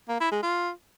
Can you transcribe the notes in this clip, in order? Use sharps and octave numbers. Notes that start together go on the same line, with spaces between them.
A#3
E4
G#3
F4